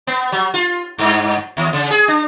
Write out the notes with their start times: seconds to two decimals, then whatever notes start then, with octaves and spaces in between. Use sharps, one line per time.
0.07 B3
0.32 F#3
0.54 F4
0.99 G2
1.57 D#2
1.73 C#3
1.91 G#4
2.08 D4